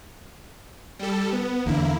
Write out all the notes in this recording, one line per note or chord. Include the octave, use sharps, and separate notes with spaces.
G3 A4
B3
E2 D3 A#3 E4